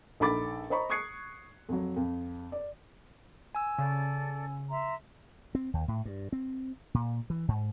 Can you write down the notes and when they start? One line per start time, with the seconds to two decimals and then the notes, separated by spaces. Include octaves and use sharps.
0.20 A#1 D#4 A4 B5 D6 A6
0.70 C5 D#5 A#5 B5 C#6
0.90 C#6 D#6 F#6 G#6 C7 C#7
1.69 F2 F#3
1.96 F2
2.52 D5
3.55 G#5 E6
3.78 C#3 A4 D5
4.70 E5 A#5 C6
5.55 C4
5.73 D#2
5.88 A2
6.05 G2
6.32 C4
6.94 A#2
7.30 E3
7.48 G#2